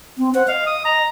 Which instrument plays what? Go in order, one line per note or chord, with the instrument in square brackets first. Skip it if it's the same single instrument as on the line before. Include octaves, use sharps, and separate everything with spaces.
[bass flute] C4
[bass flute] C5 [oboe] F#5
[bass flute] D#5 [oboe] F5
[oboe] D#6
A#5